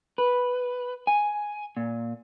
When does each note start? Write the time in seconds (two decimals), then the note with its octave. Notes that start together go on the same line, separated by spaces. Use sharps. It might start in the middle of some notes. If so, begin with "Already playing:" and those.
0.18 B4
1.07 G#5
1.77 A#2